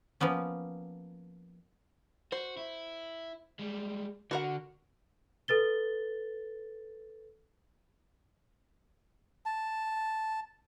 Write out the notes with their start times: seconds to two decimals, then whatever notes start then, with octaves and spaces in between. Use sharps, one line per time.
0.21 F3 A#3 B3 C#4
2.32 F#4 C5
2.57 E4
3.59 G3 G#3
4.31 D3 F#4 A#4 F#5
5.48 A4 B4 A6 G7
9.46 A5